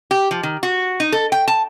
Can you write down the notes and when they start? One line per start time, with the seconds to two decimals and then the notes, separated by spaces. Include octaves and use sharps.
0.11 G4
0.31 F3
0.43 D#3
0.63 F#4
1.00 D#4
1.12 A4
1.32 G5
1.48 A5